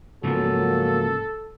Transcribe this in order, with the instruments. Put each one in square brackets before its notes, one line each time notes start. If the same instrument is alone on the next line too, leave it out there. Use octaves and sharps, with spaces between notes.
[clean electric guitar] G#2 C#3 F3 [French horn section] F#3 A#3 [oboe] A4